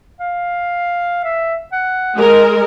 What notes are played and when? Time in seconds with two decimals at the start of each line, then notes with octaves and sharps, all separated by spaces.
0.20 F5
1.24 E5
1.72 F#5
2.17 G#3 A#4